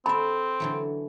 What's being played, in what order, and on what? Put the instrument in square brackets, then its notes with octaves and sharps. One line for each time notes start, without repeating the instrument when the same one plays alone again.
[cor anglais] C4 [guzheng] A4 E5 [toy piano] B5
[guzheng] D3 E3 F#3